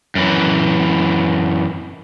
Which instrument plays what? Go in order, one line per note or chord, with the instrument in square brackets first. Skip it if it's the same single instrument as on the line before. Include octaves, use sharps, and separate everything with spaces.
[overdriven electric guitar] F#2 E3